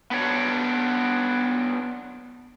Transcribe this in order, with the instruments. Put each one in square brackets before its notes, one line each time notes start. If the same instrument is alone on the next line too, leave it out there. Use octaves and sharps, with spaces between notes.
[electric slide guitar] B3 D4 C#5